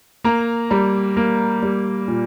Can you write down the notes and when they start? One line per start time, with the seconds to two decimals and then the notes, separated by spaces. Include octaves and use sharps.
0.24 A#3 A#5
0.70 G3 A#5
1.17 A#3
1.63 G3
2.08 A#2